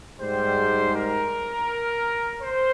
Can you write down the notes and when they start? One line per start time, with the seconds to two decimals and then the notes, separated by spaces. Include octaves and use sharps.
0.19 G#2 G3 C5
0.94 A#4
2.41 C5